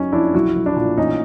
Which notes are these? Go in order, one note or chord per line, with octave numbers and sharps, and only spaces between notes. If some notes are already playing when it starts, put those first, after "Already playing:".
Already playing: F#1 F#3 C#4 D#4
F2 D4 E4
B1 E4 F#4
B1
D4 E4
A#2
A1 C#4 D#4